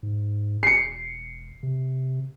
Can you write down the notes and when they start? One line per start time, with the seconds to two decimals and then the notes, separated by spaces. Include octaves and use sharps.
0.03 G#2
0.63 E1 C7 C#7
1.63 C3